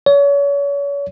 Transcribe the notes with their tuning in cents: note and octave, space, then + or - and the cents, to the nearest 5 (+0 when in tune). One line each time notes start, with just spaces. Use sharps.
C#5 +35